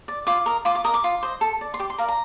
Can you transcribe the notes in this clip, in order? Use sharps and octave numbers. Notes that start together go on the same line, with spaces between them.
D5
F4 D6
A#4 D#5
F4 D6
D6
A#4 D#5 D#6
D6
F4
C5 D#5
A4
D5
C6
G4 D6
C6
A#4 D5 F5
A#5